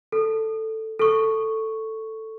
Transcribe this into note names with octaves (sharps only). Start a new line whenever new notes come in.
A4
A4 C#6